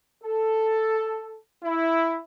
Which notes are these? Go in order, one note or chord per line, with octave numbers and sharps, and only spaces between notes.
A4
E4